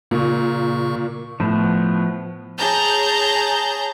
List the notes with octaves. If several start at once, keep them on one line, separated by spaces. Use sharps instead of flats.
A#2 C#3 C#6
A2 F3 B3
G#4 C#5 A5 A#5 G6